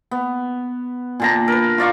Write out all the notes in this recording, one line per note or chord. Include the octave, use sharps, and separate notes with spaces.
B3
A#2 D3 A#5
A#4 B4
F4 D5 F5 C#6